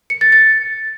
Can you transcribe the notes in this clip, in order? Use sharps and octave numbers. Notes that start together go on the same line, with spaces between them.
C#7
A6
A6